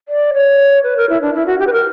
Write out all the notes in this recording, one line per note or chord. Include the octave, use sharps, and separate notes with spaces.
D5
C#5
B4
A#4
E4
D4
E4
F#4
G4
B4
A#4